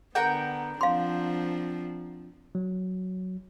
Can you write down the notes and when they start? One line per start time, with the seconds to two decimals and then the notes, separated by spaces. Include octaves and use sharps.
0.15 D3 B3 A#4 F#5 G5
0.81 F3 C4 D4 F5 C6
2.55 F#3